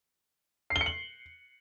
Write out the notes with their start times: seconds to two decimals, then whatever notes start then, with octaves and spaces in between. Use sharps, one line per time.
0.70 C7
0.76 G7
0.81 C#7
0.86 F#7